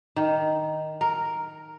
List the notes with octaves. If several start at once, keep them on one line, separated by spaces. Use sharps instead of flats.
D#3
A#4